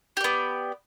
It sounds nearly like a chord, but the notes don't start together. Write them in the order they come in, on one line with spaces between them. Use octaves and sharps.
G4 D5 B3